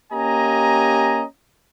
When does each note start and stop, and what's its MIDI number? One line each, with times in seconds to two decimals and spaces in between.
0.12 1.23 58
0.12 1.23 61
0.12 1.23 67
0.12 1.23 75
0.12 1.23 80
0.12 1.23 82